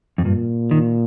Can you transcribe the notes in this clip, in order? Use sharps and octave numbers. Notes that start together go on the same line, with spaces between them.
F2
G2 A#2
D#3